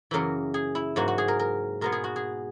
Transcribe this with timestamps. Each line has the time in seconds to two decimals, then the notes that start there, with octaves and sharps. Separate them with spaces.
0.11 F#2 C#3 E3 A#3 A#4
0.54 G#4
0.75 E4
0.96 G#2 F#3 A#3 F#4
1.08 F#4
1.18 G#4
1.28 A#4
1.39 A#4
1.81 B2 G#3 B3 A#4
1.92 G#4
2.04 F#4
2.16 G#4